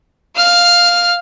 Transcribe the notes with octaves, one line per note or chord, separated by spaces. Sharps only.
F5 F6